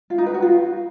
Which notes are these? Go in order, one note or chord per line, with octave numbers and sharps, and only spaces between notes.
F4
D#4
B4
F#4
F4